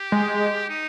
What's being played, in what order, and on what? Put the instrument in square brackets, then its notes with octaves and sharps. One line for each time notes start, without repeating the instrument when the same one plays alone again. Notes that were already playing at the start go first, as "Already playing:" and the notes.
Already playing: [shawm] G4
[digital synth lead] G#3
[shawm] D#4